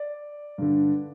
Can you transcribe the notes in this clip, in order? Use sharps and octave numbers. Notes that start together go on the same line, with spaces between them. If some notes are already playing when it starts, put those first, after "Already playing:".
Already playing: D5
G2 D3